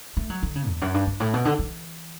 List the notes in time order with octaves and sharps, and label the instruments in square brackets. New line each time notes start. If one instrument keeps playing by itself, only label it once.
[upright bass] A3
F#3
D3
C#3
E2
F#2
G2
G2
A2
B2
D3
E3